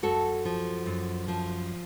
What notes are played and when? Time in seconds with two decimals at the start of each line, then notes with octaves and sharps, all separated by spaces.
0.03 F#2 F#4 A4
0.45 F3
0.86 F#2
1.28 F3